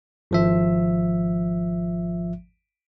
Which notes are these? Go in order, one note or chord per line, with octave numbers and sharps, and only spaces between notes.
G#1 F3 E5